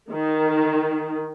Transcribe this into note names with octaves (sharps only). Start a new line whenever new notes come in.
D#3